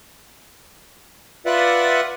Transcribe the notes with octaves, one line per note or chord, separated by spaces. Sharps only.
F4 B4 D5 E5 F#5